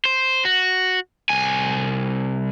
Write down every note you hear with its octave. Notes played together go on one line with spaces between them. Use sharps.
C5
F#4
C2 G#5